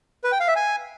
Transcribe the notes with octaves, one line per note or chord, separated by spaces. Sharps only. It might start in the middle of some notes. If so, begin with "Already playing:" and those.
B4
G5
F5
E5
G#5